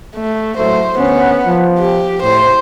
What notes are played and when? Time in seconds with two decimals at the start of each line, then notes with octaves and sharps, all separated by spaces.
0.15 A3
0.58 A2 F#3 A3 C5
0.99 D2 B3 C#4
1.46 F3
1.79 G4
2.23 A2 C5